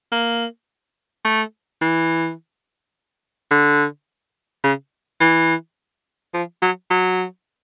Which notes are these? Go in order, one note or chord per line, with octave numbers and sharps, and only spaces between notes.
A#3
A3
E3
D3
C#3
E3
F3
F#3
F#3